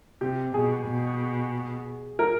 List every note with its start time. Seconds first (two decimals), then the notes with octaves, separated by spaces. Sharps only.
0.21 C3 G4
0.54 B2 G#4
0.87 B2
2.19 A#4